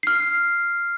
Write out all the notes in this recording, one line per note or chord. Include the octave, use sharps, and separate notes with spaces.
F6 C7